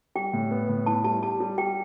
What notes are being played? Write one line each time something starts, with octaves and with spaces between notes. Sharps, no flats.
G3 G5
A2
B3
A2
E4 A5
G3 A5
G4 A5
G3
G3 G5